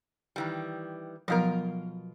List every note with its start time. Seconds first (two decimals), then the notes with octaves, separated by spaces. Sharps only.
0.36 D#3 E3 G3
1.28 B2 F3 F#3 B3 F4 A#4